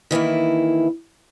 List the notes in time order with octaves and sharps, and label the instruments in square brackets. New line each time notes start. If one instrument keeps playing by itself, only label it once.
[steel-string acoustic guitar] D#3 E3 A#3 E4